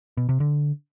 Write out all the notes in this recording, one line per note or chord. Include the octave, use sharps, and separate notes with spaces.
B2
C3
D3